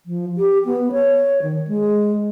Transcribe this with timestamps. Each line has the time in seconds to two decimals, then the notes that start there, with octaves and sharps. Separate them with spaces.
0.06 F3
0.38 G4
0.65 B3
0.92 C#5
1.42 D#3
1.67 G#3